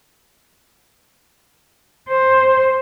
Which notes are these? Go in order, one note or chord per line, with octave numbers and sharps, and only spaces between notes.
C5